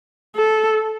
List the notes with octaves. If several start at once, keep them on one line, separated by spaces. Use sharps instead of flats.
A4